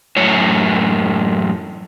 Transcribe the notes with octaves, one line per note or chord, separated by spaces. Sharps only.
F#2 A2 C#5